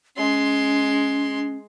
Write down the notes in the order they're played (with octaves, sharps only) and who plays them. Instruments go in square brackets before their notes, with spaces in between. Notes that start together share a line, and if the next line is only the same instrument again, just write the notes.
[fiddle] G#3 C6 [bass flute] C#4